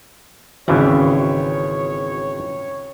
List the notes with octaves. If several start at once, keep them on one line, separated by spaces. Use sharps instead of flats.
G#1 D#2 C#3 E3 F#4 C#5